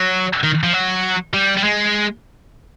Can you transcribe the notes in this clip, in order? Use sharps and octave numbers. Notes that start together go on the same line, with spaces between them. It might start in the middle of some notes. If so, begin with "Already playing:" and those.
Already playing: F#3
D#3
F3
F#3
G3
G3
G#3